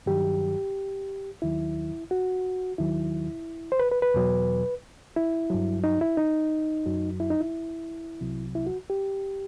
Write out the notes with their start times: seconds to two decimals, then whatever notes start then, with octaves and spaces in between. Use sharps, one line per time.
0.06 G2 D#3 F#3 G4
1.42 D#2 D#3 F#3 E4
2.11 F#4
2.78 D#2 D#3 F#3 E4
3.72 C5
3.79 B4
3.91 B4
4.02 B4
4.14 E2 B2 F#3
5.16 E4
5.50 G2 F#3
5.84 D#4
6.01 E4
6.17 D#4
6.86 F#2 F#3
7.20 E4
7.30 D#4
7.41 E4
8.21 C2 C3 F#3
8.55 E4
8.66 F#4
8.90 G4